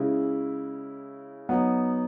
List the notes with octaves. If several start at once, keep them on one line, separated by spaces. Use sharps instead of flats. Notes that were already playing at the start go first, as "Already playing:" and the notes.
Already playing: C#3 G#3 C#4 E4
F#3 B3 D#4